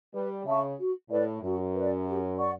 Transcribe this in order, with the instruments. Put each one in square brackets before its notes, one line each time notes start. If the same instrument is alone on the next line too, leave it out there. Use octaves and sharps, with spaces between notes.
[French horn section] G3 [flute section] B4
[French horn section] C#3 [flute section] E5 A5 C#6
[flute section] F#4
[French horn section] A2 [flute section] B4 D5
[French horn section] F#2 [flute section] F#4
[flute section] B4 D5
G4
D5 F#5 C#6